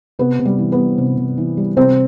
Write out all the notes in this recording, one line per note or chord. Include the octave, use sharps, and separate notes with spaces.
C3 B3 B4
C3
G3 G4
E3
B3 B4
G3
C3
C3
E3
G3
C3 C4 C5